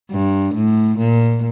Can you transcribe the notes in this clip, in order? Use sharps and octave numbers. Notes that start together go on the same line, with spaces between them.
G2
A2
A#2